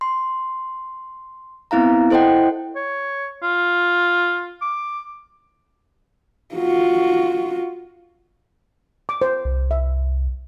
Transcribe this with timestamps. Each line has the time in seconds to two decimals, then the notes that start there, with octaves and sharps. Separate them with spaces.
0.01 C6
1.71 B3 C4 E4 F5 A#5
2.10 E4 A4 C5 D#5 F#5 G5
2.75 C#5
3.43 F4
4.61 D6
6.55 F4 F#4
9.09 D6
9.22 C5
9.45 C2
9.71 E5